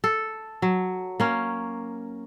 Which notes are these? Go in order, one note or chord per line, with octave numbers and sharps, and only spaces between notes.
A4
F#3
A#3 C#4